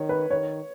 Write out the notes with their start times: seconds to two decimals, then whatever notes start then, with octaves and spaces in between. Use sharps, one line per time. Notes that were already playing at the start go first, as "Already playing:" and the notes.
Already playing: D#3 C#5
0.09 B4
0.30 D#3 C#5